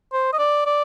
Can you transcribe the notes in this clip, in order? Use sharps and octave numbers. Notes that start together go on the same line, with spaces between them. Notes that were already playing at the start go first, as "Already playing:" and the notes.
C5
D#5
D5
D5